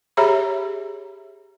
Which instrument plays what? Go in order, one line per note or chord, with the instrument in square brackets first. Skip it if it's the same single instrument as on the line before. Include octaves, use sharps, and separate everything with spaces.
[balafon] G4 G#4 C#5 E5 A#5 B5